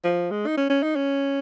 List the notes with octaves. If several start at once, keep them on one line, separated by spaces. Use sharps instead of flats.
F3
G#3
D#4
C#4
C#4
D#4
C#4